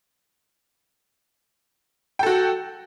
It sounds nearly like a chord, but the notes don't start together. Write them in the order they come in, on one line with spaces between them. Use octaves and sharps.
G5 A4 F#4